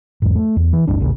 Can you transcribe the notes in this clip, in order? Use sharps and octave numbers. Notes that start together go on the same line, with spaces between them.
E2 G#2
A3
E2
E3
F#1 C#2 G2 D4
A1 D#2 C#3